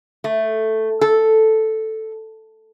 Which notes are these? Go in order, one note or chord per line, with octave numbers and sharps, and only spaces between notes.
A3
A4